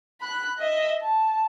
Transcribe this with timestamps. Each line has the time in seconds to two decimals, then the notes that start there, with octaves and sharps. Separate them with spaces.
0.21 B5 F#6
0.59 D#5 E5
1.02 A5